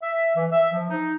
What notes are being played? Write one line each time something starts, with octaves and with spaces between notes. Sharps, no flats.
E5
E3
E5
F3
D#4